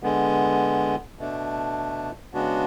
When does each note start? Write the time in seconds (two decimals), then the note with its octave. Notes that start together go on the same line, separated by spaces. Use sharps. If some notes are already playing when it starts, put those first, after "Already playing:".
0.03 D3 G#3 B3
1.19 B2 A3 D4
2.34 C#3 G#3 B3 D4 F#4